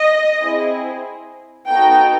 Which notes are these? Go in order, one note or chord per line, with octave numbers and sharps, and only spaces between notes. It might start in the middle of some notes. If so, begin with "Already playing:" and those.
Already playing: D#5
C4 E4 G#4
B3 D#4 F#4 A4 G5